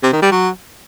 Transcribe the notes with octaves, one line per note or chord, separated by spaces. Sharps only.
C3
D#3
G3
F#3